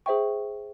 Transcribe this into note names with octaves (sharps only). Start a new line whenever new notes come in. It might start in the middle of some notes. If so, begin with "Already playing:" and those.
G#4 C5 E5 G5 C#6